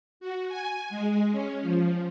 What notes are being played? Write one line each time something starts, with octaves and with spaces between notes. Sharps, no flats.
F#4
G#5
G#3
C#4
F3